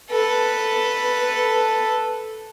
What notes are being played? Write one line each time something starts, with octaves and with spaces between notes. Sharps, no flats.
A4 B4